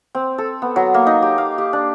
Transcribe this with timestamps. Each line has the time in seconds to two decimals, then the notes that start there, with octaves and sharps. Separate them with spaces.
0.15 C4
0.38 A4
0.62 B3
0.76 F#3
0.94 A#3
1.07 D#4
1.22 G4
1.38 F5
1.58 G4
1.73 D4